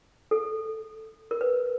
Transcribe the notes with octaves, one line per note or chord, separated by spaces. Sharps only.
A4
A#4
B4